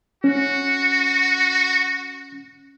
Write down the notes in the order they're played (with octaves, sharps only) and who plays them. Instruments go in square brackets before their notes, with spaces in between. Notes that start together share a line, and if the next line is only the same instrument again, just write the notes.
[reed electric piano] C#4 [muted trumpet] F#4